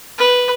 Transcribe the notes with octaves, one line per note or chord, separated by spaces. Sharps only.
B4